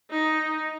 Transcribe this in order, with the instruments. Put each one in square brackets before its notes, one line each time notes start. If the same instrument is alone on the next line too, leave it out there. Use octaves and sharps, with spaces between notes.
[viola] D#4